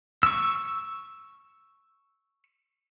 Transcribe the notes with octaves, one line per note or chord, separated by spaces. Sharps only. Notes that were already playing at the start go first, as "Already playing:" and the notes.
C#6 E6